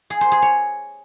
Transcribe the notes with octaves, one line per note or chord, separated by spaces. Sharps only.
G#4
C5
G#4
C#5